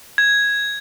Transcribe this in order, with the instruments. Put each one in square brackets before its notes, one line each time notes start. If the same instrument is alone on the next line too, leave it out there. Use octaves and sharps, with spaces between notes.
[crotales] G#6